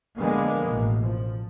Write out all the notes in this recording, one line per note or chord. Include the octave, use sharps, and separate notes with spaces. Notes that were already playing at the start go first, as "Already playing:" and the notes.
D3 F3 G#3 A#3 B3
A1 B2
F3